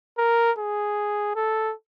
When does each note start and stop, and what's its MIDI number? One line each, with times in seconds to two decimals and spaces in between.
0.18 0.51 70
0.58 1.35 68
1.36 1.74 69